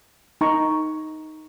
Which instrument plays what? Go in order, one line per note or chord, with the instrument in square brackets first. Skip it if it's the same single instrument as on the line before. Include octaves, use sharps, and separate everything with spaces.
[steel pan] D#4 A#5 C#6